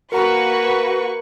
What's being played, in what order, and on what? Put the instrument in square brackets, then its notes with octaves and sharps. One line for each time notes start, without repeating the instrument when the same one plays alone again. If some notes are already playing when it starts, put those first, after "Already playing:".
[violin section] A#3 B4 C#6 [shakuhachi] F#4 [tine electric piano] A#4 A#5